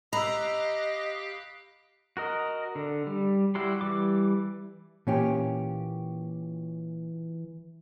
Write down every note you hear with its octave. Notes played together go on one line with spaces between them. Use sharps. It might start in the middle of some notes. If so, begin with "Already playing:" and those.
G4 D#5 F5 A#5 B5 E6 F#6
F#4 A#4 D#5
D3
G3
G3 E4 F#4 G4 C6
E3 G3 D6
A#2 E3 C#4 G4